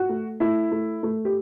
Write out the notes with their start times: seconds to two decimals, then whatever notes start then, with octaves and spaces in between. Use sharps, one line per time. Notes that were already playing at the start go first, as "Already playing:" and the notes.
Already playing: F#4
0.09 A3
0.40 A3 E4
0.71 A3
1.03 A3
1.25 G4